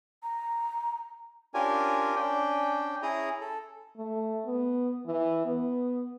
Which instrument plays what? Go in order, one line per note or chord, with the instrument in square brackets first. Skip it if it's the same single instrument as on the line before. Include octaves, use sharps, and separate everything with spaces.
[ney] A#5
[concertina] C#4 D4 F4 G4 A#4 G#5
C#4 D4 G5
C#4 E4 G#4 A#5 D#6
A4
[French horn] A3
B3
E3
B3